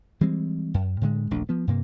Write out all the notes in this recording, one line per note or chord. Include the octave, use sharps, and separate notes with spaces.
E3 G3 G#3 C4
F#2
A2 D3 G#3
D#1 A#1 A3 D4
F3 B3
G2 C3 A#3